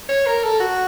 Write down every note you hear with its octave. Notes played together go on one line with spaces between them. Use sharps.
C#5
A#4
A4
F#4